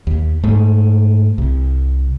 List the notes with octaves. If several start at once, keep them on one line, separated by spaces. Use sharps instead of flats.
D#2
G#2 A3
C2